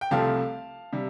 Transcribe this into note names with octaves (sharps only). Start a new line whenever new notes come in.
G5
C2 C3 F3 A3 C4 F5 A5
C3 G3